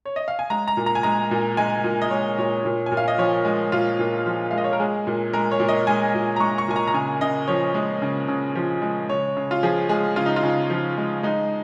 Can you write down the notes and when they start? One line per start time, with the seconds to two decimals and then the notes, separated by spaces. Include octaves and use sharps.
0.05 C#5
0.16 D#5
0.28 F5
0.39 G#5
0.50 G#3 A#5
0.68 A#5
0.77 A#2
0.86 A#5
0.95 G#5
1.03 G#3 A#5
1.31 A#2
1.57 G#3 G#5
1.84 A#2
2.02 D#5
2.10 G#3 C#5
2.38 A#2 C#5
2.65 A#2
2.86 G#5
2.92 A#2
2.97 F5
3.08 D#5
3.18 F3 C#5
3.45 G#3
3.72 A#2 F4
3.99 A#2
4.26 F3
4.51 G#3 F5
4.58 D#5
4.64 C#5
4.73 A#4
4.80 G#3 G#4
5.07 A#2
5.33 G#3 A#4
5.51 C#5
5.60 A#2
5.69 D#5
5.87 G#3 G#5
6.14 A#2
6.36 A#5
6.40 G#3 C#6
6.58 C#6
6.68 A#2 G#5
6.76 A#5
6.87 A#5
6.94 C#3 G#5
7.21 C#3 D#5
7.47 F3 C#5
7.74 G#3
8.02 C#3
8.28 C#3
8.55 F3
8.82 G#3
9.09 C#3 C#5
9.37 C#3
9.51 F4
9.63 F3 G#4
9.89 G#3 G#4
10.16 C#3 F4
10.26 D#4
10.36 F4
10.43 C#3
10.70 F3
10.97 G#3
11.23 G#3 D#4